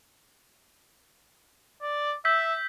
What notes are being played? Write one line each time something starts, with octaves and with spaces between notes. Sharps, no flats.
D5
E5 E6 G6 B6